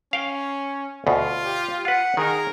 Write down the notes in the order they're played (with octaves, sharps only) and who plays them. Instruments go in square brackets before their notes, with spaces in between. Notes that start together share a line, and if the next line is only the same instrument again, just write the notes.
[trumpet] C#4 [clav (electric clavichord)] F5 G5
[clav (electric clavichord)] D2 B2 [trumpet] F4
[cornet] G4
[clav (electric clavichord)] F4 B4 [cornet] F#5
[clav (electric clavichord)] D#3 D#4 [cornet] G#4 [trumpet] A#4